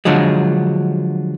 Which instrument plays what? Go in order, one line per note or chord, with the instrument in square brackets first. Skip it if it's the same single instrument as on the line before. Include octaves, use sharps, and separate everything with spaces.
[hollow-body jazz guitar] D3 F3 F#3 G#3